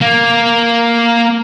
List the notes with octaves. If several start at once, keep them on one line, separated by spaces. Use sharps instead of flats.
A#3